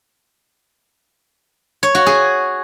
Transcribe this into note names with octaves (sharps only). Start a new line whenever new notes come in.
C#5
F#4
G#4